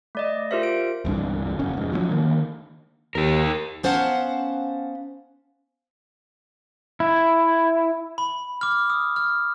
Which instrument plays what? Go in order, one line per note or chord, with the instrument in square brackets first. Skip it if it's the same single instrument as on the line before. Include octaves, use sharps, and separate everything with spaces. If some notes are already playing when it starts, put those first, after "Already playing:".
[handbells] A3 D5 D#5
F4 G4 A#4 C5 E5
D7
[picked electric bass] E1 C2 G2 D3
F#1 C#4
F1 G#2
F3 F#3 G#3 C#4
D3 D#3 A#3
[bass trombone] D#2 [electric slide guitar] G4 A#4
[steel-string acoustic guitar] B3 C#4 C5 F5 F#5 A5
[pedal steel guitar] E4
[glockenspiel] B5
D6 F6
D#6
F6